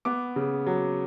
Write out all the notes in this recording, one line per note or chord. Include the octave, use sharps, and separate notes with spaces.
B3 D6
C#3
F#3